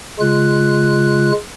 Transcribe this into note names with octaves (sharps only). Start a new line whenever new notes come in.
C#3 G#3 F4 F#6